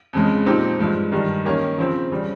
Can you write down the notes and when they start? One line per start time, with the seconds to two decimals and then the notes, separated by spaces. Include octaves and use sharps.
0.13 F2 C#3 G#3
0.46 A#2 F3 C4 D#4 G4
0.79 G2 F3 G#3
1.12 G2 D#3 G3
1.45 D#3 A#3 C#4 G4
1.78 C#3 F3 C4
2.12 C#3 G3